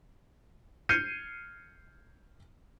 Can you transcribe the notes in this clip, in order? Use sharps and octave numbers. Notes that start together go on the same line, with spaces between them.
F6 G6 G#6 C7 C#7 D#7